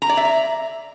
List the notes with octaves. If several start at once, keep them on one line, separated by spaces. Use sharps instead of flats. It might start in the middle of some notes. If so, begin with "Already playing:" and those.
A#5
D5
E5
A#5